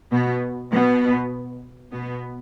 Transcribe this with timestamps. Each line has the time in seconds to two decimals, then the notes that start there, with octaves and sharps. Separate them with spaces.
0.12 B2 B3
0.72 B2 B3
1.92 B2 B3